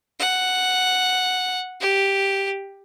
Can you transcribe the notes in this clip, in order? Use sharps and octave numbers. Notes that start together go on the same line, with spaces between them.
F#5
G4